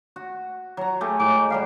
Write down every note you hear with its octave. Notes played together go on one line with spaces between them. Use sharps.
F#4
F#3 A#5
A3 G4 G#4
A2 G#3 D6
F#3 G3 G4 F5